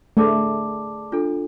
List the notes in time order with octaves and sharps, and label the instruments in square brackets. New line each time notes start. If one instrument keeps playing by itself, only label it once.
[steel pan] A3 [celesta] G#4 D5 A5 D6
[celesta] D4 F4 A4